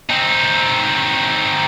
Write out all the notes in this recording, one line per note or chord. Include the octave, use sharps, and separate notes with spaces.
C4 D#4